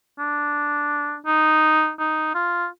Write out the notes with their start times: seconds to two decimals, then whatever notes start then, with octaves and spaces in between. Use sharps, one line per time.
0.19 D4
1.27 D#4
1.99 D#4
2.35 F4